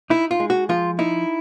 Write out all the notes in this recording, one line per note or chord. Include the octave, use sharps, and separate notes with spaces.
D#4 E4
F4
G#3
F#4
F3 F4
D#4 E4